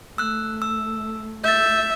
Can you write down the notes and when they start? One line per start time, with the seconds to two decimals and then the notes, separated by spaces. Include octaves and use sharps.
0.18 A3 E6 F#6
0.62 E6
1.44 E5 G6 A6